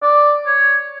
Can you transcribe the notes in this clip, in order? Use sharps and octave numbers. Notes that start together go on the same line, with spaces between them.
D5
C#5